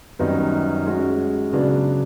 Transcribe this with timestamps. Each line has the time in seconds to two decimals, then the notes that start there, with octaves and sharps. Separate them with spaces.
0.19 F#2 D#3 G3 B3 D#4
0.86 G#3 C#4 F#4
1.52 C#3 F#3 B3 D4